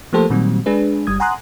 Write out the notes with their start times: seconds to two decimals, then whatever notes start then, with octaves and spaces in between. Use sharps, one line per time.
0.13 F3 A3 A#3 G4 A4 C5
0.30 A#2 D#3 F#3 G3 C4
0.66 G#3 D4 G#4 B4
1.07 G1 G3 D#6 G#6
1.20 F#5 G#5 A#5 C6 D#6 F#6